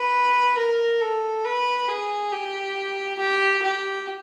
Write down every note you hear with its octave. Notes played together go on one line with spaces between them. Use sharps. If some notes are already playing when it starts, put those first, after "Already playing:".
Already playing: B4
A#4
A4
B4
G#4
G4
G4
G4